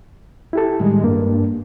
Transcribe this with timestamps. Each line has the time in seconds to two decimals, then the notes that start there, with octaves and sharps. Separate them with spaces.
0.53 E4 G4 A4
0.80 A2 D#3 G3 G#3
1.04 G2 A#3